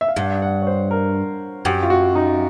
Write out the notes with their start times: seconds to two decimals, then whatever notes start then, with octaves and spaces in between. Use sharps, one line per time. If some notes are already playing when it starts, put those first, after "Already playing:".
0.01 E5
0.08 F5
0.16 G2 F#5
0.42 F#5
0.62 C#5
0.67 C5
0.91 A#4
1.65 F#2 G4
1.83 F4
1.90 F#4
2.15 D#4